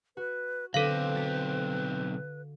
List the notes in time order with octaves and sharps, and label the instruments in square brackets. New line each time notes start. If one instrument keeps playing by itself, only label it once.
[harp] F#4 [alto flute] B4
[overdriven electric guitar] B1 C4 [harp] D3 [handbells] A4 F5 [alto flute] B4
[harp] F#4 A6 B6